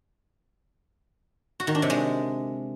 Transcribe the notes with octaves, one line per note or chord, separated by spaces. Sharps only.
F#4
D#3
D4
C3
G#3